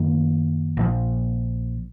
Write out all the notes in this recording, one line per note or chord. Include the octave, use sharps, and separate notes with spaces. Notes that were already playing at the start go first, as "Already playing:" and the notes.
Already playing: F#2 D#3 A#3
A#1 A#2 F3